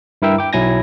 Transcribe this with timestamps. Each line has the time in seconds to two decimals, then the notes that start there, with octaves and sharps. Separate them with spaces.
0.22 G2 E4 A#4 E5 G5 E6
0.38 G5 D6
0.53 B1 F#3 E4 G#5 G#6 A#6